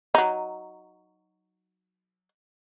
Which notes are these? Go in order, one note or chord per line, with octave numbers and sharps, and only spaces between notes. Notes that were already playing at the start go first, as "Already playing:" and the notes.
F#3 D#4